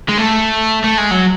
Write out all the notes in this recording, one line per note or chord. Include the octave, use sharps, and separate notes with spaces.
G#3
A3
A3
G#3
F#3